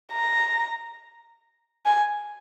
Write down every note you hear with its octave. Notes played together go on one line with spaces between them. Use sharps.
A#5
G#5